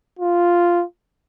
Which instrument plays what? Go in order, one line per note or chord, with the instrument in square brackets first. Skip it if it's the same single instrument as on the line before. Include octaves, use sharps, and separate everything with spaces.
[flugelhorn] F4